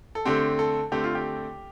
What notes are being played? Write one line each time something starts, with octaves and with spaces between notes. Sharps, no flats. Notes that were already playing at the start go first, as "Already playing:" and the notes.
A4
D3 A3 C4 G4
A4
D3 A3 C4 G4
F4
G4